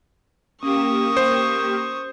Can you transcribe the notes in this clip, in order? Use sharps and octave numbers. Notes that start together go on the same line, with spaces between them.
A#3 C#4 G4 C#6 D#6 E7
C5